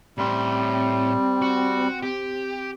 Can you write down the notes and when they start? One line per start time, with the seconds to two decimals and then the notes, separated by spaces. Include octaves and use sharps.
0.18 A2 G3 C4 C6
1.42 F#4
2.03 G4